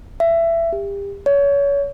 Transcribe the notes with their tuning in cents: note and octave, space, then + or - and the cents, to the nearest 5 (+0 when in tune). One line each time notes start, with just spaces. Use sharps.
E5 +20
G4 +30
C#5 +25